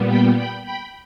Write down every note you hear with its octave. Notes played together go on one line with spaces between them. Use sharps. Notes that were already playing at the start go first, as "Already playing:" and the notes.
Already playing: A#2 G3 B3
G5 B5
G5 B5
G5 B5